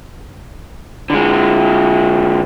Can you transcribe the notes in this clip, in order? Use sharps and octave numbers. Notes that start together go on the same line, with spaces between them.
D3 G#3